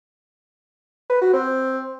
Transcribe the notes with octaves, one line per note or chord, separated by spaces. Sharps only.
B4
F#4
C4